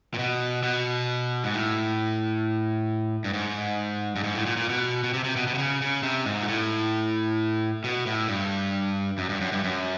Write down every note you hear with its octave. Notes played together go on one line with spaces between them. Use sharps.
A#2
B2
B2
G#2
A2
G2
G#2
G2
G#2
A2
A#2
A#2
B2
B2
C3
C3
B2
B2
C3
C#3
C#3
C3
G#2
A#2
A2
B2
A2
G2
F#2
G2
F#2
G2
F#2